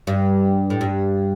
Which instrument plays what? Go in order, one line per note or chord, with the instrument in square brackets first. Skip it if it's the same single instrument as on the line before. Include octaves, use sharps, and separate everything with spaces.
[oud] G2
A2
G2